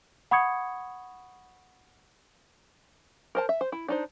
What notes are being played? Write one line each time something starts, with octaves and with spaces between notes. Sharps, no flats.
F#5 B5 C#6 D#6 G#6 C#7
A#4 C5 A5
E5
C5
E4
D4 D#4 C5